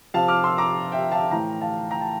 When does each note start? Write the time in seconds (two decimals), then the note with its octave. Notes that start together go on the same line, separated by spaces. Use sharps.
0.14 C3 F3 F5 A5
0.28 D6 F6
0.44 C6 E6
0.58 A#5 D6
0.92 E5 G5
1.12 F5 A5
1.31 A2 E3 G5 A#5
1.61 F5 A5
1.91 G5 A#5
2.01 A5